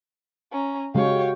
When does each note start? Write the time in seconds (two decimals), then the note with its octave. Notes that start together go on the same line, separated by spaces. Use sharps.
0.52 C#4 A#5
0.95 C#3 G#3 F#4 G4 C#5 F5 G5